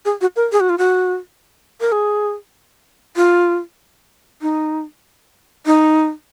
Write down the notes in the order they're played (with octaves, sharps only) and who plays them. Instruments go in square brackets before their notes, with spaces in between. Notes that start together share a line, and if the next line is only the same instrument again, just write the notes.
[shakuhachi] G#4
F#4
A#4
G#4
F#4
F4
F#4
A#4
G#4
F4
D#4
D#4